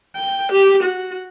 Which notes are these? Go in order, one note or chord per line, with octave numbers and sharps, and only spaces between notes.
G5
G4
F#4